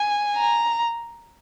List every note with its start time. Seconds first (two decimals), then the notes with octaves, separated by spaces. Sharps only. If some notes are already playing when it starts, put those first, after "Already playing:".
Already playing: G#5
0.37 A#5